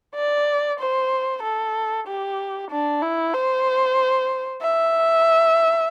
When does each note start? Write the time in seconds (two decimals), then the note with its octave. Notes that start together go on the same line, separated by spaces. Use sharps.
0.15 D5
0.80 C5
1.43 A4
2.07 G4
2.71 D4
3.02 E4
3.34 C5
4.61 E5